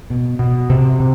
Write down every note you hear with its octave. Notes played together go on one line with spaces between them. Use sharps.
B2
B2
C3
C3